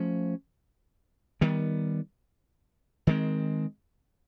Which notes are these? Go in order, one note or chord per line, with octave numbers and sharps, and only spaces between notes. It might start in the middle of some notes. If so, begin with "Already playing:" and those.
Already playing: F3 A3 C#4
D#3 G3 B3
D#3 G#3 C4